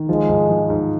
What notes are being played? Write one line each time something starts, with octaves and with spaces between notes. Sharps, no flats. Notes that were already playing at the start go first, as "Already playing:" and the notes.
Already playing: D#3
F3 G#3
G#2
F3
G#2